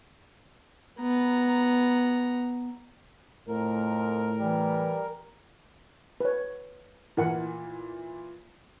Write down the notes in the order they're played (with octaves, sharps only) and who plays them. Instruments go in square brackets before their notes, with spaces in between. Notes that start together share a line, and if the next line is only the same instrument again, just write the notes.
[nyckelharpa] B3 A#5
[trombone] F2 [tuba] A2 [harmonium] A#4
[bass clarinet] E3 [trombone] G3
[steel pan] B4 C#5
[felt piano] A#2 E3 [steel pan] E4 A#4 F#5